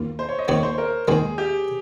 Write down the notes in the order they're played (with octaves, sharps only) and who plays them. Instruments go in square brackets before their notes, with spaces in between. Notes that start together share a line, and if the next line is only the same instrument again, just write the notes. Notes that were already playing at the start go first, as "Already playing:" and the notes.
Already playing: [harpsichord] D#2 A#3 F4
[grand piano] C5
C#5
D#5
[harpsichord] D#2 D#3 A#3 D#4 [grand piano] C#5
[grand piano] C5
A#4
[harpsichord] D#2 D#3 G#3 [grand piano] G#4
[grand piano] G4